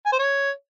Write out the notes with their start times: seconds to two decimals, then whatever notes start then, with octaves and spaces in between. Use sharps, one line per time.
0.06 G#5
0.12 C5
0.19 C#5